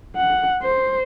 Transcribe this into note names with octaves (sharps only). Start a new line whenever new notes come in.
F#5
C5